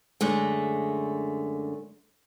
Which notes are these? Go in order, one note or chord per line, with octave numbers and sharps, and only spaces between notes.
F#2 D3 G#3 A3